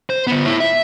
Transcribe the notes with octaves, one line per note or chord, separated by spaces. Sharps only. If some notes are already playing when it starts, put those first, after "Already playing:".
C5
D3 B3
E4 C#5
E5